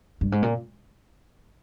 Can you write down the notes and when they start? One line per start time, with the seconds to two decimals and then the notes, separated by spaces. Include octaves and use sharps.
0.21 G2
0.32 G#2
0.42 A#2